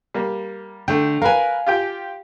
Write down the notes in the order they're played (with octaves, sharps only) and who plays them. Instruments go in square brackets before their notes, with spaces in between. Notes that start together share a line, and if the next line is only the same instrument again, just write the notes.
[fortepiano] G3 A#3
[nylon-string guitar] D3 [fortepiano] A3 G5
[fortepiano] A#4 B4 [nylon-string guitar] F5 G#5
[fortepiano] F4 G4 G5